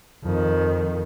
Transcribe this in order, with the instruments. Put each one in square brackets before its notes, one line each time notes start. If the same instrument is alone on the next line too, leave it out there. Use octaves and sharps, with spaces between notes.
[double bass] F2 D#3